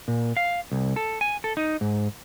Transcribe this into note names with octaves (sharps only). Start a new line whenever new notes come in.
A#2
F5
C2
A4
G#5
A4
D#4
G#2